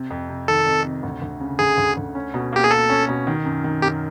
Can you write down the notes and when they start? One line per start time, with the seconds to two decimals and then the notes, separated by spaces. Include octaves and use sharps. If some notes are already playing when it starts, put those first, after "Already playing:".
Already playing: C3
0.10 F2
0.29 C3
0.48 D#3 A4
0.66 F2
0.85 C3
1.03 D2
1.22 D2
1.40 C#3
1.59 D2 G#4
1.78 D2
1.97 D2
2.15 C#4
2.34 B2
2.53 A#3 G4
2.64 G#4
2.71 A#3 A4
2.90 C#4
3.09 B2
3.27 D#3
3.45 F#2
3.64 D#3
3.82 F#2 G4